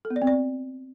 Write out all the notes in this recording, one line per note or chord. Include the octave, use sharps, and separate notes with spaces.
A4
B3
D5
C4
D5